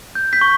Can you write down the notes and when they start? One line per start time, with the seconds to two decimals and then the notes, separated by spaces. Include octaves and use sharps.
0.15 G6
0.33 G6 B6
0.41 C#6